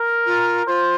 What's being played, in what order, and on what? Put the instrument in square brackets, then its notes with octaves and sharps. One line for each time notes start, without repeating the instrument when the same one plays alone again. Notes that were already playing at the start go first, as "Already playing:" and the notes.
Already playing: [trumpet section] A#4
[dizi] F4
[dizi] F4 [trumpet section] C5